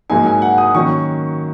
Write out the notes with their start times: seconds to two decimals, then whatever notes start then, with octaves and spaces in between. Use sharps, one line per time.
0.10 G#2 F#3 A#3 D#4 G#5
0.27 G#5
0.42 F#5
0.58 D#6
0.74 D#3 F#3 A#3 C#4 C#6